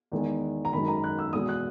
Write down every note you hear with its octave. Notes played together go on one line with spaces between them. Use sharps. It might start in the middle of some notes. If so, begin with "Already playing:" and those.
E2 D#3 G#3
A#5
F#2 D#3 G#3 B5
A#5
F#6
E6
E2 B2 G#3 D#6
F#6